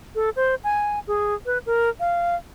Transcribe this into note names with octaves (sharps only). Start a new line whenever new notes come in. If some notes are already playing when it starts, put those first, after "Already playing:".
A4
C5
G#5
G#4
B4
A#4
F5